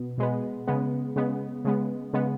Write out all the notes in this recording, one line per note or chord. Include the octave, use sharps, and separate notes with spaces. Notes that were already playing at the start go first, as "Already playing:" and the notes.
Already playing: B2 B3
B2 G#3 B3
C#3 G#3 B3
C#3 G#3 B3
C#3 G#3 B3
C#3 G#3 B3